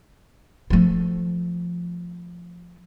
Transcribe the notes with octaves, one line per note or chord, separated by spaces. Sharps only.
F3 A3